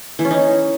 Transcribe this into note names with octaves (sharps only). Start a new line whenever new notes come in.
E3
C#4
D#4